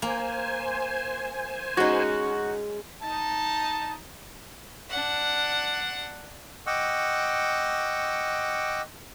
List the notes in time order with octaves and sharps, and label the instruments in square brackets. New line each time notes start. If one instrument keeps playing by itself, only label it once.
[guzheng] A#3 [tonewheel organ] C5 G#5
[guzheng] G#3 C#4 [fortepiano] D#4 F#4
[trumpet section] D#4 A5
[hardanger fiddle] D4 F#5
[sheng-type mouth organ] D#5 F#5 G5 C#6 D6 E6